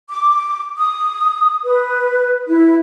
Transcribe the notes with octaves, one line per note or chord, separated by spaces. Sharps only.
D6
D#6
B4
E4